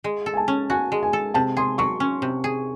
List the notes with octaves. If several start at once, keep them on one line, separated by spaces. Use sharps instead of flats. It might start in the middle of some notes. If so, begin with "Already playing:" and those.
G#3
A4
G#5
A5
C#4
F#4 G#5
G#3
G#5
A4
C3 A5
G#4 C6
F#3 C#6
C#4
C3
G#4